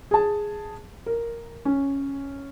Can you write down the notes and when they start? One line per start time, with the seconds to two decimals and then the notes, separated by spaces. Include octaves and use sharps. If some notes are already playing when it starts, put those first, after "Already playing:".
0.11 G#4 A5
1.06 A#4
1.65 C#4